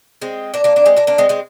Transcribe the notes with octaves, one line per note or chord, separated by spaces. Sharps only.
G#3 C4
A#3 D4
A#3 D4
A#3 D4
G#3 C4
A#3 D4
A#3 D4
G#3 C4
G#3 C4